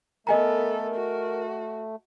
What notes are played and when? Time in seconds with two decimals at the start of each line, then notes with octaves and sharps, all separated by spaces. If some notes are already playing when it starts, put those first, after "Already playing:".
0.27 A3 B3 A4 A#4 D#5 G#5 A#5
0.95 F#4